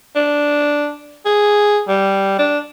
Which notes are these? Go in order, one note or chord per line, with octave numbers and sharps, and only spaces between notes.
D4
G#4
G3
D4